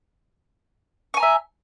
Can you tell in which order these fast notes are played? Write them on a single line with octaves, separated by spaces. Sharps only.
C#6 G#5 A#5 E5